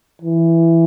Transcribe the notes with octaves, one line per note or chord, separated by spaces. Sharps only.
E3